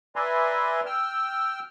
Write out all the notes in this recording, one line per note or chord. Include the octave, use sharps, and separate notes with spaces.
B4 D5 E5 G#5 A#5 C6
G5 E6 F6